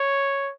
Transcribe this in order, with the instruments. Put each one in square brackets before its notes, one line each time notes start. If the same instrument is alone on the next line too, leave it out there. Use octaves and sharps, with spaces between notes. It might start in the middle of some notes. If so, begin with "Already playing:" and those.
Already playing: [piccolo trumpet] C#5